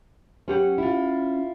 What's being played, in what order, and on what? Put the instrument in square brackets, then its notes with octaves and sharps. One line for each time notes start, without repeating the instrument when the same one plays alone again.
[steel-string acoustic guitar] F#3 [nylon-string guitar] C#4 G4 F#5
[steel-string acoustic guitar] E4 F4